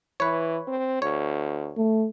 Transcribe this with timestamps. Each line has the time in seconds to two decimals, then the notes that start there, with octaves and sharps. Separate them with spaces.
0.20 E3 B4 C#5
0.68 C4
1.02 D2 C#5
1.77 A3